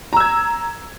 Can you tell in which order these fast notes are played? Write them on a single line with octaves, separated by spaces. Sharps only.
A#5 E6 G#6